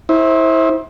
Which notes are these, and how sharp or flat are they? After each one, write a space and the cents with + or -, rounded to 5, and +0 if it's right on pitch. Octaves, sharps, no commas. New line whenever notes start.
E4 -25 C5 +25